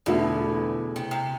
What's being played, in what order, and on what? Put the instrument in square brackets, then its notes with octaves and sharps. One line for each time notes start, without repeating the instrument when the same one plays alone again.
[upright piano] E2 D3 A3 E4 [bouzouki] B2
[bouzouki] C3
C3